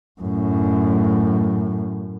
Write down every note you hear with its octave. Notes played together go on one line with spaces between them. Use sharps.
F#2 A2